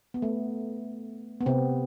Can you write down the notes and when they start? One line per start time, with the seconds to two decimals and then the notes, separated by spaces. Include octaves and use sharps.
0.14 B3
0.22 A3
1.41 B3
1.46 C3 C4